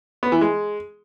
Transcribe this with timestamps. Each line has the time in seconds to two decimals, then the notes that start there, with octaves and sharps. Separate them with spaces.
0.23 B3
0.32 E3
0.41 G#3